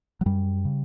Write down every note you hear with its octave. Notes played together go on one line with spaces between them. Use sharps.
F#3
F#2 G3
C#3